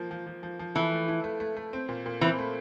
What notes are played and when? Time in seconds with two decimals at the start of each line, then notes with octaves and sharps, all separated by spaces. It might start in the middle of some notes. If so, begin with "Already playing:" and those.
Already playing: F3 A#3
0.11 F3
0.27 F3
0.43 F3
0.59 F3
0.75 E3 A4
0.92 A3
1.08 E4
1.24 A3
1.40 A3
1.56 A3
1.73 C4
1.89 A#2
2.06 A#2
2.21 E3 C4
2.39 A3